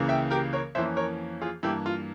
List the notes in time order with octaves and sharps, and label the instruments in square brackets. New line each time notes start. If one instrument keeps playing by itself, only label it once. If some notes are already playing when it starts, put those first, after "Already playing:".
Already playing: [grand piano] C#2 C#3 E3 A#3
E5 G5
G4 A#4
A#4 C#5
F2 E3 A#3 C#4 C5 E5
A#4 C#5
F4 G#4
G2 E3 A#3 E4 G4
F4